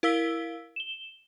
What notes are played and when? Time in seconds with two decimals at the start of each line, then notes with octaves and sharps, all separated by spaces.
0.03 E4 A#4 F5 E6 B6 G7
0.76 E7 G7